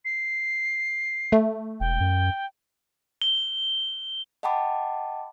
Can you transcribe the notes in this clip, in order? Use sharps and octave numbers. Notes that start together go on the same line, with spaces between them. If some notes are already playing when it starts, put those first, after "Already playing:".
C7
A3
E1 G5
F#2
G7
D#5 F#5 G5 A5 B5 D6